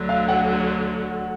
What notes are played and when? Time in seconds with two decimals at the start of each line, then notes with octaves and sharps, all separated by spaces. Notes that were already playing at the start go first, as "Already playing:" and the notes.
Already playing: D2 D3 F#3
0.09 F5
0.28 F#5